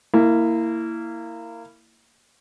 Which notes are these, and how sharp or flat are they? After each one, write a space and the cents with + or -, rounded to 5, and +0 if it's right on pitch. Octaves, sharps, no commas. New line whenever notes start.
A#3 -20 E4 +0